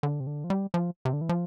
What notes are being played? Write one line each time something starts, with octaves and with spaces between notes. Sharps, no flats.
D3
C3
D3
F3
G3
F3
C3
D3
E3
F3